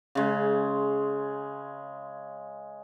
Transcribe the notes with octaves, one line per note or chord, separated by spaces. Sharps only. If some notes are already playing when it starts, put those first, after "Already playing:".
C#3 G#3